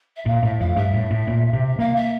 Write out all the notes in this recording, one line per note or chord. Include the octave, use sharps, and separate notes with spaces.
E5
A#2 F5
A2 E5
F2 F5
G2 E5
A2
A2
A#2
C3
A#3 F5
E5